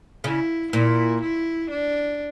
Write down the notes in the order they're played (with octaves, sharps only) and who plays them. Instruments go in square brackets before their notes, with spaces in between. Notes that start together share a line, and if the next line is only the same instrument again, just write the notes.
[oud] C#3 [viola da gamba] E4
[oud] A#2 [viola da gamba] E4
[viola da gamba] E4
D4